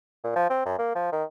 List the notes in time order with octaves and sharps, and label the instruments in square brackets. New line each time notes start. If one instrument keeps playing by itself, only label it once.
[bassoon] A#2
F3
C4
F#2
A#3
F3
D#3